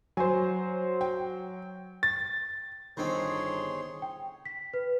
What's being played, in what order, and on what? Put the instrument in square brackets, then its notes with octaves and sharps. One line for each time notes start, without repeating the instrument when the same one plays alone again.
[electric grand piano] F#3 [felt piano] C5 G#5
[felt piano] G5
[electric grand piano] A6
[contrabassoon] G1 [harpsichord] D#3 C4 [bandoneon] G#4 C#5 C6
[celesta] G5
B6
B4